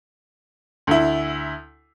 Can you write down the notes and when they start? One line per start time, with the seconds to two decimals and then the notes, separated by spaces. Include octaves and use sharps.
0.87 D2 E4